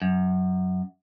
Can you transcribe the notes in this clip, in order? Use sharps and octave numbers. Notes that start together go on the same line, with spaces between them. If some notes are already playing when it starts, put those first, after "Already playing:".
F#2